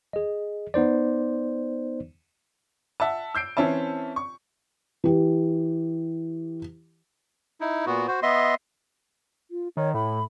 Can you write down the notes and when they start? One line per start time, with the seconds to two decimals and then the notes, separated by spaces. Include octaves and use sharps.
0.13 G#4 D#5
0.74 B3 D#4 C5 D5
3.00 E5 F#5 A5
3.35 E6 G6 C7 D7
3.57 E3 C4 C#4 E5 A5
4.16 C#6
5.04 E3 G4
7.61 D#4 E4
7.86 A#2 B3 F#4
8.08 F#4 C5
8.23 B3 D#5 E5 C6
9.51 F4
9.77 D#3 C#5
9.94 A2 B5